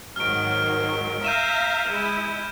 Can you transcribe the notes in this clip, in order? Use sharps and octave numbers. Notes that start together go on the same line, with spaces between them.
G#2 D#3 F#3 F6 D7
F6
E5 F5 A#5 G6 D#7 E7
G#3 E4 E7